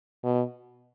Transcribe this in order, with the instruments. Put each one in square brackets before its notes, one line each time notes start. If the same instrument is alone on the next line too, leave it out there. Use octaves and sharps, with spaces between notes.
[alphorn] B2